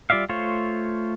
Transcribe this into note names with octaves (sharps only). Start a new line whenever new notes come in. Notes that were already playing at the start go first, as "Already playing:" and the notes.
G3 F4 D5 E5 F5
A3 F4 C5 C#5